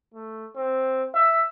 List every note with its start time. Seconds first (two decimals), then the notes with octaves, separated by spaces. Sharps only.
0.14 A3
0.56 C4
1.15 E5